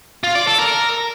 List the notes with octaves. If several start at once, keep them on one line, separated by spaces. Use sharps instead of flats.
F4
D5
A4
A#4